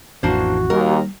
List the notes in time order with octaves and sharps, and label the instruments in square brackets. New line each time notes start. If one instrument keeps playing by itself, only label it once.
[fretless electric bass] A1 F2 E3 [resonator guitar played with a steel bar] A#3 D4 C5 [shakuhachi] F#4
[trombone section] D#2 [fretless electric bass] G3 [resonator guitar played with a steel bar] A#4